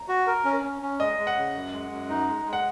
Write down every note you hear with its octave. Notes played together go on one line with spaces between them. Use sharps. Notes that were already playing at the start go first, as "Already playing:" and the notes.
Already playing: A#5
F#4
A#4
C#4
C#4
C#4
G#3 D#5
G#3
F#5
C#3
F#2
G#3
F#2
D#4
G#3
G#3
F#5